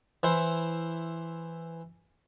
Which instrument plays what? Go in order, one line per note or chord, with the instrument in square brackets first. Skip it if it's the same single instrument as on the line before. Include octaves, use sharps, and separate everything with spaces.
[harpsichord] E3 E4 C5